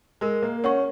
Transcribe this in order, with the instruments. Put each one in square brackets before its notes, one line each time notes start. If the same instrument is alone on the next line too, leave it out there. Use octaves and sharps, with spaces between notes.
[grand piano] G#3 [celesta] A#4
[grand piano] A#3
[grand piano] C#4 [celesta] C#5 F#5 C#6